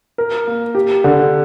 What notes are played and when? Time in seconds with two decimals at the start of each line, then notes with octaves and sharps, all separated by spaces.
0.18 A#4
0.47 A#3
0.75 G4
1.04 D3